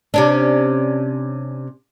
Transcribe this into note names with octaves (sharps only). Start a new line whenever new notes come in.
C3 C#4 D4